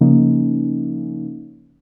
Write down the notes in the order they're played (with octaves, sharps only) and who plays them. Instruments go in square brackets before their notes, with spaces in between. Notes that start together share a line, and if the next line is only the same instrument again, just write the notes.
[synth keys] C#3 F3 A#3 C#4 D#4